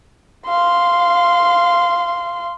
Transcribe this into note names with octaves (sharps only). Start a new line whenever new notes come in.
F5 C6